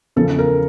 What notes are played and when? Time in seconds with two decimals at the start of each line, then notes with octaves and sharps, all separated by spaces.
0.16 E2 C#3 F3 A4
0.39 A#4